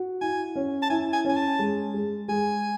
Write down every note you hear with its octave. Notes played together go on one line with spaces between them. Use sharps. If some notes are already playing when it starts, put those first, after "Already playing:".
Already playing: F#4
E4 G#5
C#4
A5
E4 G#5
G#5
C#4 G#5
A5
G#3
G#3
G#3 G#5